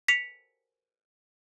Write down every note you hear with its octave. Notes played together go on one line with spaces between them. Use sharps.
B6 C#7 F7